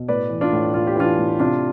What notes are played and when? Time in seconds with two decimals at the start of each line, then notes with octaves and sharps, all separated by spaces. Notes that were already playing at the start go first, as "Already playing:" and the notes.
Already playing: B2
0.08 A2 B4 D5
0.30 E3
0.41 D4 F4
0.53 A2
0.74 A2 F4
0.87 G4
0.96 E3 D4 F4
1.19 A2
1.39 C3 D4 F4